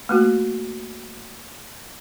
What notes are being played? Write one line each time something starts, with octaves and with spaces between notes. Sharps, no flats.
A3 A#3 F#4